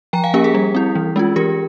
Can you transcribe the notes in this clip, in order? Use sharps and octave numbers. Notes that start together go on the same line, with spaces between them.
F3 G5 A#5
F5 G#5
A#3 C#4 G4 A#4
G#4
G3
C4 E4
E3
G#3 C#4 F4
E3 G4 A#4